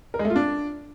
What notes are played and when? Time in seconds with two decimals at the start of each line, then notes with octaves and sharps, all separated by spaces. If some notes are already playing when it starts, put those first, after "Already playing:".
0.14 A#4
0.19 G#3
0.25 A3
0.30 F4
0.36 D4